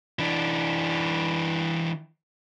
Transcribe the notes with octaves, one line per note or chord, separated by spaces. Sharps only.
E3 D4